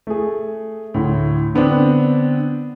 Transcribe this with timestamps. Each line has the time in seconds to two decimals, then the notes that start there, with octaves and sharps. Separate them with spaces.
0.07 A3 G#4
0.94 D2 A2
1.54 D3 B3 C4 D4